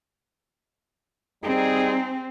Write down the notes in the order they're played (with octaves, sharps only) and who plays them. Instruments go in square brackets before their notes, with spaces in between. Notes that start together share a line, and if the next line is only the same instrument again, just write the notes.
[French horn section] G3 D#4 G#4 [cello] C4